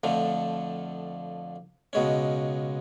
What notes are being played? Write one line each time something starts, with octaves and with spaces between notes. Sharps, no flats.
F2 D3 F3 A3
C#2 B2 G#3 C#4